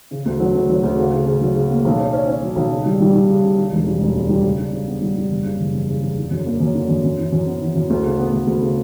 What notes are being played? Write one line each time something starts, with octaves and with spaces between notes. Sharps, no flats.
C#3
D2
F#3
D2
F#3
D2
C#3
C#3
C#3
F#3
C#3
A#3
B1
C#4
C#4
C#4
F#3
B1
C#3
G3
G3
G3
C#3
C#3
D3
E1
G3
E1
D2
G3
C#3
D4
C#3
B3
G3
G3
F#1
C#3
F#1
E2
C#3
E2
D3
F#2
A#3
F#2
D3
F#2
F#2
E3
F#2
B3
E3
F#2
D2
C#3
B3
D2
D2
C#3